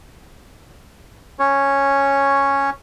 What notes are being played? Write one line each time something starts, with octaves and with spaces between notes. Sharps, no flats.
C#4 C#5